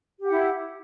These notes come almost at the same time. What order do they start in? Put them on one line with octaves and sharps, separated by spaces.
G4 F#5 E4